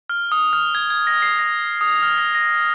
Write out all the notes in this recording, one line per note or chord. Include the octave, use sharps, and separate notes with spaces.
F6
D#6
F6
G#6
G#6
A#6
C7
A#6
D#6
F6
A#6
A#6